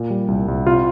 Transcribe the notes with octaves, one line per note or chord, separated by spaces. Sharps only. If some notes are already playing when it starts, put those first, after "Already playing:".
Already playing: A#2
G3
C2
C2
C3 F4